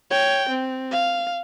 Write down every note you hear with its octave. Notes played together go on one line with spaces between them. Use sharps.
C#5 G5
C4
F5